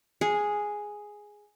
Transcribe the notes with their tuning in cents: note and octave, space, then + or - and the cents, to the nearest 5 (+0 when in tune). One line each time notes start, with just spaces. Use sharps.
G#4 +0 F#5 -40